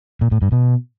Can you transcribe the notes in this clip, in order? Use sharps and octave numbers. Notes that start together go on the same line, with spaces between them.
A#2
A2
G2
B2